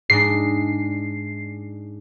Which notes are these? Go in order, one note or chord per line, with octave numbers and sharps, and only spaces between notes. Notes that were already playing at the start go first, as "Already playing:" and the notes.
G#2 G#3 D4 C7